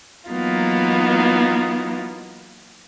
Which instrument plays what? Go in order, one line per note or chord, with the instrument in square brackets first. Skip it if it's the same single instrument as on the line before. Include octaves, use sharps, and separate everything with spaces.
[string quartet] E3 F#3 A#3 B3 D#4 F4